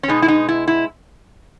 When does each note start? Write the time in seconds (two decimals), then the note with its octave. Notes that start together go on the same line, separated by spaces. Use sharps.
0.03 C#4
0.08 B2 G#3 D#4
0.22 E4
0.28 D#4
0.49 E4
0.68 E4